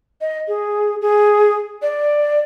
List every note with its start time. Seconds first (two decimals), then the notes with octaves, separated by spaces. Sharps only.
0.21 D#5
0.48 G#4
1.01 G#4
1.82 D5